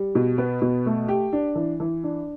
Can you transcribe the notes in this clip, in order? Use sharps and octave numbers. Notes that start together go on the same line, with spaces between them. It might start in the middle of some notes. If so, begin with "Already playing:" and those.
Already playing: G3
B2
B3
B2
A3
G4
D4
E3
E3
D4